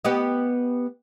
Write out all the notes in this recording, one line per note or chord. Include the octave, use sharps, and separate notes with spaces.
B3 G4 D#5